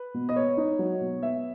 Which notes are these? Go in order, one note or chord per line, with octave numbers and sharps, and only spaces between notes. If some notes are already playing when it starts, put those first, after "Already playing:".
Already playing: B4
B2
D#5
B3 C#5
D#4
F#3
B2
B3 E5